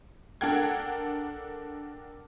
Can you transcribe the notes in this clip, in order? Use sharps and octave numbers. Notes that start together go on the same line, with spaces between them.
D4 A4 A#4 F#5 G5 G#6